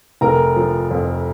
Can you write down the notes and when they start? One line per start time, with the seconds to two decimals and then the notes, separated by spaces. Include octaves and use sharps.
0.21 F1 A#4 A#5
0.56 F3
0.91 F2